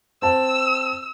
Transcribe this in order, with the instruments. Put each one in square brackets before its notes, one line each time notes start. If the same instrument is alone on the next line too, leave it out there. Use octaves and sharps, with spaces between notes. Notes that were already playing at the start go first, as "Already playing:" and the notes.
[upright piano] C4 A5 [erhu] E6